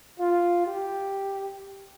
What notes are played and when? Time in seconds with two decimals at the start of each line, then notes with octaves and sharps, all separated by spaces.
0.19 F4
0.66 G4